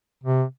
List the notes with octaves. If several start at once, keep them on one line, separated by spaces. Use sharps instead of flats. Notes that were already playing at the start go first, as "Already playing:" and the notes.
C3